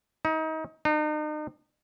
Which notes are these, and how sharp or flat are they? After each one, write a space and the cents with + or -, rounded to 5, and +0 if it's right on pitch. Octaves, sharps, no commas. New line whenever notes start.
D#4 +30
D#4 -40